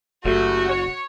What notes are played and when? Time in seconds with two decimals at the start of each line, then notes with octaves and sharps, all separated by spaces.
0.25 F#1 F#3 G3 A3 F#4
0.69 C#5